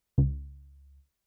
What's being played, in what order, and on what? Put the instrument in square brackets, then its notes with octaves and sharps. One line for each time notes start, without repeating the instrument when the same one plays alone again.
[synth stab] C#2